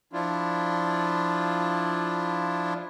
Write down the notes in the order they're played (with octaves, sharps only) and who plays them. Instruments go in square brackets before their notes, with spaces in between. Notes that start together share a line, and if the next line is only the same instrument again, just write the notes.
[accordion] F3 D4 E4 F4